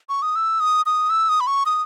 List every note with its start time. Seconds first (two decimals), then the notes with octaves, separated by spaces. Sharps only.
0.09 C#6
0.22 D#6
0.36 E6
0.60 D#6
0.86 D#6
1.10 E6
1.29 D#6
1.40 B5
1.47 C#6
1.66 D#6